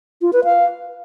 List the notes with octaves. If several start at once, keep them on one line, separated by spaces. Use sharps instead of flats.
F4
B4
F5